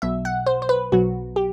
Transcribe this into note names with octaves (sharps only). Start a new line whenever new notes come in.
B1 B2 F#3 E5
F#5
C5
C5
B4
B1 B2 F#3 F#4
G4